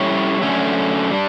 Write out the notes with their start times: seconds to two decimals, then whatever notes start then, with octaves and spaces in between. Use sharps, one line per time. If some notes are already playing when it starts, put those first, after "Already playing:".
Already playing: G3 C#4 E4 A4 C#5
0.42 F#2 D3 A3 C#4
1.11 G3 D4